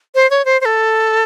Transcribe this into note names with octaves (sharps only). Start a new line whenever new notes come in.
C5
C#5
C5
C5
A4